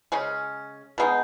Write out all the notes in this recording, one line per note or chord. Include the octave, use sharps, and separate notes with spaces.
C#3 G#3 C#4
B2 G#3 B3 D#4